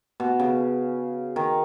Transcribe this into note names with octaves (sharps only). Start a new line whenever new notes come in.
B2
C#3
D#3